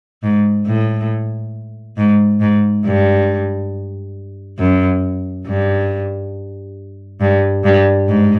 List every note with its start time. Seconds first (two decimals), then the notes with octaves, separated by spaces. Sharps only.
0.23 G#2
0.66 A2
1.97 G#2
2.40 G#2
2.85 G2
4.59 F#2
5.46 G2
7.21 G2
7.64 G2
8.08 G#2